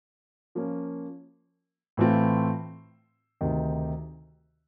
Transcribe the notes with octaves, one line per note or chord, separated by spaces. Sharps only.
F3 A#3 C#4
A2 E3 A3 C4 F4
D2 C3 D#3